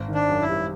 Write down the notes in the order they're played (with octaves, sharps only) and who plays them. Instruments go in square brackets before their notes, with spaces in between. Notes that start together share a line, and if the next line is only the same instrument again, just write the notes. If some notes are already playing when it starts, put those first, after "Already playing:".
Already playing: [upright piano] G#1
D#3
[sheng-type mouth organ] D4
[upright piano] F#2
[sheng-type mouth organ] E4
[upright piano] G3